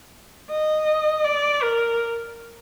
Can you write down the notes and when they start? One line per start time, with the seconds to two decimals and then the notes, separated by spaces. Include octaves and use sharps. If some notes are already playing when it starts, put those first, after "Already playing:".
0.51 D#5
1.24 D5
1.63 A#4